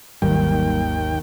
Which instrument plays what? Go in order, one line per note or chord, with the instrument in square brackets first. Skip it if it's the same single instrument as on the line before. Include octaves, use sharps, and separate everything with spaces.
[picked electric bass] G#1 F#3 [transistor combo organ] D#2 G5 [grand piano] D#3 A#3 [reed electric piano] G3